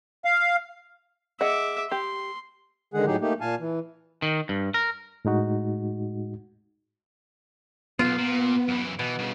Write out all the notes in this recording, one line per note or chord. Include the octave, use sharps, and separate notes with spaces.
F5
G#4 D#5 E5 F#5 D6
G4 C6
D3 D#3 G#3 G#4 F#5
A2 F#3 D#4 G4 G#4
A3 A#3 D#4 G4
A#2 F5 G#5 A5
E3
D#3
G2
A#4
A2 G#3 D#4 F#4
B1 E2 B3 F4
A#2
F#2 E3
B2 E3
G2 C#3